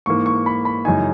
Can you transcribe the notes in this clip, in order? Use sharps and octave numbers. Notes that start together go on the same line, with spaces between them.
G#2 E3 A#3 C#6
C#6
B5
B5
F#2 C#3 E3 G#3 D#4 G#5